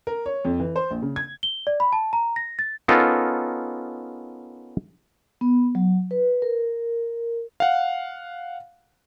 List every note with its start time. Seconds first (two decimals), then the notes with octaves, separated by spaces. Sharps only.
0.07 A#4
0.26 C#5
0.45 F2
0.60 E3
0.76 C5
0.91 A#1
1.02 C#3
1.16 G#6
1.43 G7
1.67 D5
1.80 B5
1.93 A5
2.13 A#5
2.36 A#6
2.59 A6
2.88 B3 C#4 D#4 F4 A4 A#4
5.41 B3
5.75 F#3
6.11 B4
6.42 A#4
7.60 F5 F#5